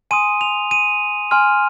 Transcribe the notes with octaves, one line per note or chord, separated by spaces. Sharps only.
G#5 C6 D#6 D#7
F7
D#7
G#5 C6 F6